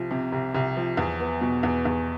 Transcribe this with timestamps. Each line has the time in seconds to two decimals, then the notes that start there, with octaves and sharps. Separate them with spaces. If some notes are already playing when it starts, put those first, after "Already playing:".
Already playing: C2 F3
0.11 C3
0.32 C2
0.54 C2
0.77 F3
0.97 E2
1.20 B3
1.41 B2
1.63 E2
1.85 E2